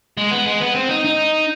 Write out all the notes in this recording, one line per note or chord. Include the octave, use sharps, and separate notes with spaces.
G#3
B3
G#3
B3
C4
D#4
D#4